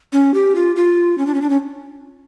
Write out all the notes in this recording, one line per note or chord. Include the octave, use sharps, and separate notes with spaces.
C#4
G4
F4
F4
C#4
D4
C#4
D4
C#4